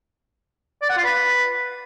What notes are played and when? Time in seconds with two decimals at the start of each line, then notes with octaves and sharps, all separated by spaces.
0.82 D5
0.89 F#5
0.97 F4
1.04 B4